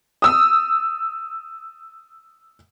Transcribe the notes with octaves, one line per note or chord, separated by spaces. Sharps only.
D#6 E6